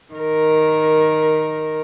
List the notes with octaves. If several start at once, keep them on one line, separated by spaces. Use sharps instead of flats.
D#3 A#4